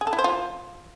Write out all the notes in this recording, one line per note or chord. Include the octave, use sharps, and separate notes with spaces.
G#4
A4
E4
C5
F4